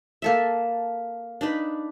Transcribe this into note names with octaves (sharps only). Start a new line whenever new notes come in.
A#3 A4 E5
D4 D#4 B4